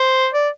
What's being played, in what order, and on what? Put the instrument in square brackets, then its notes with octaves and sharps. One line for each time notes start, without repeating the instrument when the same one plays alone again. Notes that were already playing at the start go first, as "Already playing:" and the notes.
Already playing: [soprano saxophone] C5
D5